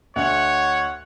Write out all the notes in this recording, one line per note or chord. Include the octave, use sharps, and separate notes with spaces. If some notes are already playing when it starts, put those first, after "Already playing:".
D2 C#5 D#5 F#5